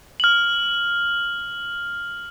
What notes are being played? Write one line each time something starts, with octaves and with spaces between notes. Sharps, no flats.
F6 F#7